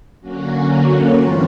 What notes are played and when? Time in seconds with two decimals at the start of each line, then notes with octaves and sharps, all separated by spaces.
0.21 D3 F#3 A#3 C#4 F#4
1.14 G2 E3 A3 C4 F4